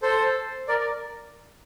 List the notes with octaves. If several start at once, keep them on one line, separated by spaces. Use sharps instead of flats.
A4 C5
A#4 D5